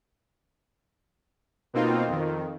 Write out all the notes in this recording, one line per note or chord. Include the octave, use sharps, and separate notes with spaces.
B2 A#3 C4 D#4 F4
F2 D#3